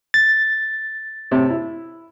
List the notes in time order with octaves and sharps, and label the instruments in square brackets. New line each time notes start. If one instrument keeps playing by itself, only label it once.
[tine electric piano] A6
[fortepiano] A2 C3
E4